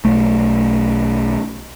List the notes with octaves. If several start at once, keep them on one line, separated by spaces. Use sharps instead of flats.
B1 A3